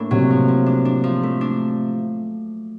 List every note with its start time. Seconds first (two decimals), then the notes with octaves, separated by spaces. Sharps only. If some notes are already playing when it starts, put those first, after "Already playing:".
Already playing: A2 A#3 D4
0.11 C3 F#3
0.30 F3
0.48 F3
0.66 D4
0.85 D4
1.04 F3
1.23 A3
1.41 D4